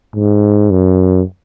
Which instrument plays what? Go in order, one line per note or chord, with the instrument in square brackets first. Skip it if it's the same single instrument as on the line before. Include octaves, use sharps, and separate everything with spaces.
[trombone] G#2
F#2